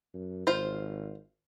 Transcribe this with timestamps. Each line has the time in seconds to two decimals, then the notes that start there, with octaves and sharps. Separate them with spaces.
0.14 F#2
0.47 G#1 F4 C5